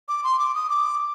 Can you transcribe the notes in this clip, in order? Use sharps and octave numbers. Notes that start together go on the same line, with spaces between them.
D6
C6
D6
D#6
D6